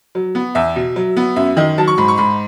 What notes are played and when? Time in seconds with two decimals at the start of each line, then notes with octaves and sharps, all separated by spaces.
0.15 F#3
0.35 B3
0.55 E2 E5
0.76 B2
0.96 F#3
1.17 B3
1.36 F#2 E5
1.57 D#3 D#5
1.78 F#3 A5
1.88 C#6
1.98 G#2 B5
2.08 C#6
2.18 G#2 B5